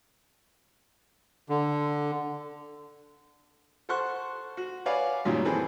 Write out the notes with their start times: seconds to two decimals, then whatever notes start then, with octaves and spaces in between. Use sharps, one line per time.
1.49 D3
3.89 A4 C5 F#5 C6 C#6 F#6
4.57 F#4
4.86 B4 C#5 D5 F5 F#5 G#5
5.25 F#2 A#2 D#3 F#3 G3
5.45 E3 C4 G#4 A4 B4